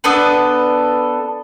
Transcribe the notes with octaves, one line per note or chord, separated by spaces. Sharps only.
B3 D4 A4 B4